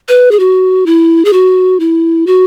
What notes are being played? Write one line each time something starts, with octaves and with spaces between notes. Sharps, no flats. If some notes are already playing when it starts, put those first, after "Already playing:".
B4
G#4
F#4
E4
G#4
F#4
E4
F#4